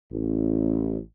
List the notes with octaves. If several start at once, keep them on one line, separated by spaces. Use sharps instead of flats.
A1